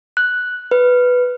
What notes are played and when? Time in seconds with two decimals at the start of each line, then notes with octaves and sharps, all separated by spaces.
0.17 F#6
0.71 B4